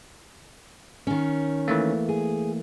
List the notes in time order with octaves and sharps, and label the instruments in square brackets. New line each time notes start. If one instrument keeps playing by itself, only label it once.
[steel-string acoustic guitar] D#3 C#4
[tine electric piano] E3 A3 A#3
[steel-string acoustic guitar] G#4